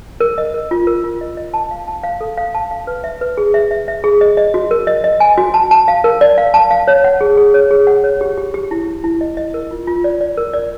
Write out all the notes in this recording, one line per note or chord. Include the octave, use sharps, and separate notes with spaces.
A#4
D#5
A#4
F4
A#4
F4
D#5
D#5
A5
F5
A5
F5
A4
F5
A5
F5
B4
E5
B4
G#4
E5
E5
E5
G#4
D#5
D#5
F#4
A#4
D#5
D#5
G#5
F#4
A5
A5
F5
A#4
D5
F5
A5
F5
C#5
F#5
G#4
G#4
C#5
G#4
F#5
C#5
G4
G4
G4
E4
E4
E4
D#5
D#5
A#4
F4
F4
D5
D5
A#4
D5